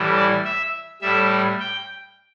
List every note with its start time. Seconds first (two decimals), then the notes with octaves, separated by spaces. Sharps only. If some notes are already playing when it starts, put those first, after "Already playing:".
Already playing: A2 E3 G3
0.16 D5
0.45 E5
1.01 A2 G3 E5
1.59 G5